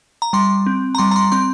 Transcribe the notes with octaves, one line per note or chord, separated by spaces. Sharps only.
A#5
G3 C6
C4
A#5
G3 C6
A#5
C6
C4 C6